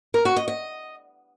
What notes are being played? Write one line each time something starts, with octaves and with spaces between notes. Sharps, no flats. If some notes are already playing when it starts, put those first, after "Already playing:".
A#4
F#4
D#5
D#5